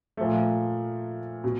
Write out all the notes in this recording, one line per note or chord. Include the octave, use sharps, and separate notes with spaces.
A#2 F3 A3
B2